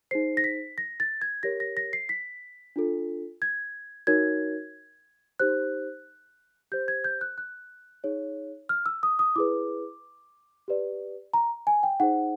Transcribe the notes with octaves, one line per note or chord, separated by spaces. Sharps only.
D#4 G#4 C5 C7
A#6
B6
A#6
A6
G#6
G4 A#4 C#5 A#6
A#6
A#6
C7
B6
D4 F4 A4
G#6
D#4 F#4 A#4 C#5 G#6
D#4 G4 C5 F#6
G4 C5 G6
G#6
G6
F#6
F#6
D#4 G#4 C#5
F6
E6
D#6
D#6
E4 G#4 B4 D6
G4 B4 D5
A#5
G#5
G5
D#4 G#4 C5 F#5